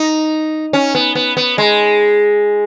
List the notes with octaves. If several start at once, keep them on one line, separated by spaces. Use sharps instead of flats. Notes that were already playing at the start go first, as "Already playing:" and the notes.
Already playing: D#4
C#4
B3
B3
B3
G#3